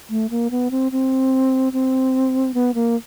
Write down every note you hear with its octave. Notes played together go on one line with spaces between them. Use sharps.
A3
A#3
B3
C4
C4
C4
B3
A#3